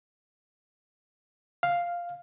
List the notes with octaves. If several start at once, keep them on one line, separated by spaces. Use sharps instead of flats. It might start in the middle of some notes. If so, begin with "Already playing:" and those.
F5